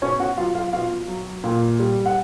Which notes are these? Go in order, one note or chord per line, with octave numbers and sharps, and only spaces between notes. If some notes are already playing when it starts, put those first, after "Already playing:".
B2 C#4 C#5
F#4 F#5
F#3 F4 F5
F4 F5
B2 F4 F5
F#3
A#2
G3
F#5